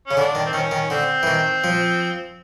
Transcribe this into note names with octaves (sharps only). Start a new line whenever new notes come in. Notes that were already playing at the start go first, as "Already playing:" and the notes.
C#3 C#4
D3 D4
D#3
C4
D#3 C#4
D#3
D3 C4
E3
D#3
F3